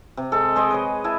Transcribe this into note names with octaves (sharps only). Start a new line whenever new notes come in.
C3
G#3 A4
G#3 C5 D#5 G5
B4 C#5 G#5
E4 G#5 A5